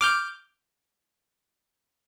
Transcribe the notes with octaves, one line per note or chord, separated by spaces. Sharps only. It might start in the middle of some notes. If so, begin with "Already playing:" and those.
D6 F6 G6